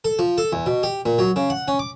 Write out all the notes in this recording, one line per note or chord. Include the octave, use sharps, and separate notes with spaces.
A4
F3
A4
E2
B2
G4
A#2
F#3
C#3
F#5
C#4
D6